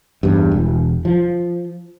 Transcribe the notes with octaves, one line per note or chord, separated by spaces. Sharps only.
E2 G2
E1
F3